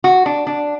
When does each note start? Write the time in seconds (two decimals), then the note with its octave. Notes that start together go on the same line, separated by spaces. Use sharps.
0.04 F#4
0.26 D4
0.47 D4